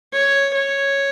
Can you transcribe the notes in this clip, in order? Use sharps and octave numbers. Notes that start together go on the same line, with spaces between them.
C#5
C#5